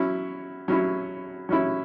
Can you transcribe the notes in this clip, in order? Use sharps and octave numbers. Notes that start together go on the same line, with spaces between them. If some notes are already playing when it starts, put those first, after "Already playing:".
Already playing: F#3 C#4 E4
F#3 C#4 E4
F#3 C#4 E4